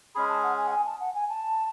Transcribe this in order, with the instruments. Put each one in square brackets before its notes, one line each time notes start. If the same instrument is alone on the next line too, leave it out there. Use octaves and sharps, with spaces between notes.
[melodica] G#3 C#4 G#4 [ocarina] B5
[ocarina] A5
F#5
G#5
F#5
G#5
A5
F#5
G#5
A5